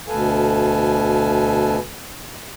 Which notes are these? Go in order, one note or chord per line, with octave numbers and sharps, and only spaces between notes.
D2 B2 A4 B4 F5 G#5